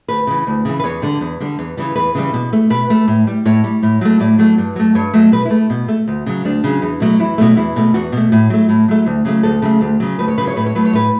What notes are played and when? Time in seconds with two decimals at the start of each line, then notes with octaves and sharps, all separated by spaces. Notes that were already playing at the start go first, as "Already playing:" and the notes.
0.08 D2 B4
0.27 C#3 E3
0.47 D2
0.65 C#3 E3
0.80 B4
0.84 E2 C#5
1.02 D3 G3
1.21 E2
1.40 D3 G3
1.59 E2
1.77 C#3 E3 G3
1.96 E2 B4
2.15 C#3 E3 G3
2.33 B2
2.53 A3
2.70 B2 B4
2.90 A3
3.08 A2
3.27 G3
3.45 A2 C#5
3.64 G3
3.83 A2
4.01 F#3 A3
4.20 A2 D5
4.39 F#3 A3
4.58 G2
4.76 F#3 A3
4.95 G2 C#5
5.14 F#3 A3
5.32 B2 B4
5.45 E4
5.51 A3
5.70 B2
5.88 A3
6.08 D2
6.26 C#3 F#3
6.45 D2 D4
6.64 C#3 F#3
6.82 E2
7.00 B2 F#3 A3
7.20 E2 E4
7.38 B2 F#3 A3
7.57 E2 E4
7.76 B2 A3
7.94 E2 F#4
8.12 B2 A3
8.32 A2
8.50 F#3 A3
8.69 A2
8.88 F#3 A3
9.06 D2
9.25 C#3 F#3 A3
9.43 D2 A4
9.62 C#3 F#3 A3
9.81 D2
10.00 C#3 F#3
10.19 D2 B4
10.28 C#5
10.38 C#3 F#3 B4
10.47 C#5
10.56 A2 B4
10.66 C#5
10.75 F#3 A3 B4
10.85 C#5
10.93 A2 B4